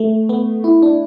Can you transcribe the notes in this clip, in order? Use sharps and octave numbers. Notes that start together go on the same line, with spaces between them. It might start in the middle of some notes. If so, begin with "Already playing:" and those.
Already playing: A3
B3
E4
D4